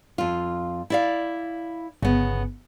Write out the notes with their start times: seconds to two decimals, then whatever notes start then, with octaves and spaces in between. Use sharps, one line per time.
0.18 F2 F4
0.90 E4 D5 F5
2.03 G1 C#3 B3